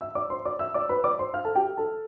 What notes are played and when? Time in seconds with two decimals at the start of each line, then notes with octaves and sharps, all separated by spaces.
0.01 E5 E6
0.15 D5 D6
0.30 C5 C6
0.45 D5 D6
0.59 E5 E6
0.74 D5 D6
0.89 B4 B5
1.04 D5 D6
1.19 C5 C6
1.34 F5 F6
1.45 A4 A5
1.55 G4 G5
1.77 A4 A5